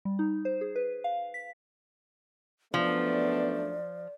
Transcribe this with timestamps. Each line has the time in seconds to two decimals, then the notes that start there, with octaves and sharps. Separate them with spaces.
0.05 G3
0.19 D#4
0.45 C5
0.61 G#4
0.76 B4
1.04 F5
1.34 B6
2.74 F#2 F3 A3 B3 D4 D5